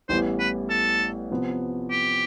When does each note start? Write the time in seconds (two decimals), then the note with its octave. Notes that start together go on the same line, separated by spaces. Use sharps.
0.09 A1 A2 E3 G3 B3 C5
0.40 B4
0.70 A4
1.31 C3 F3 B3
1.91 G4